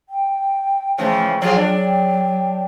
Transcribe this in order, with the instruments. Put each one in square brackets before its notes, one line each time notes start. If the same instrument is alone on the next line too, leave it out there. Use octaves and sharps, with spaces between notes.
[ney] G5
[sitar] C#3 E3 F3 [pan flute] A3 [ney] G5
[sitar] F3 F4 G#4 [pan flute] F#3
[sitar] D4
[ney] G5